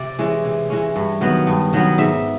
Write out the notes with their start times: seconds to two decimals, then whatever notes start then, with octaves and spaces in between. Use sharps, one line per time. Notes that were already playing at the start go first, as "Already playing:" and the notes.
Already playing: C3 D5
0.19 E3 G#3 C#4
0.45 C3
0.70 E3 G#3 C#4
0.96 G2
1.21 D#3 F#3 B3
1.47 G2
1.73 D#3 F#3 B3
1.98 G#2 E5